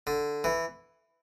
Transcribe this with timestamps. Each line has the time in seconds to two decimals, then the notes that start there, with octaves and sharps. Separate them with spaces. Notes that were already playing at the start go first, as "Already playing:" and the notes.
0.07 D3
0.44 E3